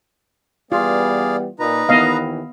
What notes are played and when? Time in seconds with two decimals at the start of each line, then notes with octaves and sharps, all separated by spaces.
0.72 E3 G3 B3 F4 G#4 D5 F5
1.59 A#2 D#4 B4 A#5
1.89 D#2 D#3 E3 B3 D#5 F5